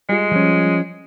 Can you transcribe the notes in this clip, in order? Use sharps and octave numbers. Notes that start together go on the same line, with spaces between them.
G3 G#3 F4
F3 C#4